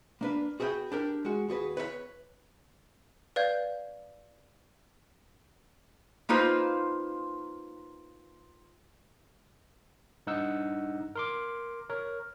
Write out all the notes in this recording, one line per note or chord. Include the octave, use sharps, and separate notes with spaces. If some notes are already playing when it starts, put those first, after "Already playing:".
A#3 D4 B4
F#4 G#4 B4 E5 G5
D4 G4 A#4
G#3 F#4
D#2 F#4 G#4 B4
B4 C#5 E5 B5
B4 D5 F5 G6 G#6
A#3 D#4 F4 B4 C5
G2 D#4 F#5 E6
A#4 C6 D6
A#4 C#5